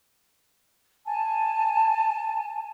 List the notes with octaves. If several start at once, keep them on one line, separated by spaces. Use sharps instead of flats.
G#5 A5